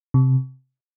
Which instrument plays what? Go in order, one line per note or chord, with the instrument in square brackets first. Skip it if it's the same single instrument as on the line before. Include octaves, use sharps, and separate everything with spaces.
[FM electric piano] C3